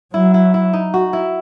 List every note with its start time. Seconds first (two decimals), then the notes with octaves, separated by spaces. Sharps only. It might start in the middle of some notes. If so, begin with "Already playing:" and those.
0.14 F#3 E4
0.34 E4
0.54 E4
0.73 D#4
0.94 F#4
1.13 E4